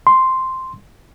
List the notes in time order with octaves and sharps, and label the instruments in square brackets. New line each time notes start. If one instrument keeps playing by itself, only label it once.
[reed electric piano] C6